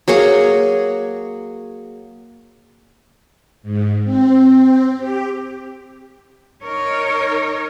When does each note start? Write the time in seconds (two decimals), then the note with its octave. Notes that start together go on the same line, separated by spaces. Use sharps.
0.08 F#3 A#3 G#4 C#5
3.63 G#2
4.05 C4
4.98 G4
6.63 D#4 A#4 C#5